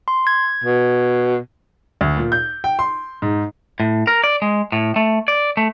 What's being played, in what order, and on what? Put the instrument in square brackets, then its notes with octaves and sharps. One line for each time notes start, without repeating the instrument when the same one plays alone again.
[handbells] C6
G#6
[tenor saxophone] B2
[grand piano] D2
A#2
G6
G5
C6
G#2
[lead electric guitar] A2
A#4
D5
G#3
A2
A3
D5
A3